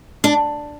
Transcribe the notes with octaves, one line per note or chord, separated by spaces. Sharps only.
D4